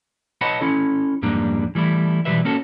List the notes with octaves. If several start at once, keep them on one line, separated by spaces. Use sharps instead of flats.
B4 C#5 D#5 F#5 A5 B5
C#4 E4 A4
F2 G#2 G3 A#3 D4
E3 G3 A3 E4
B1 F2 E3 G3 B4 E5
A#3 C#4 F#4 A4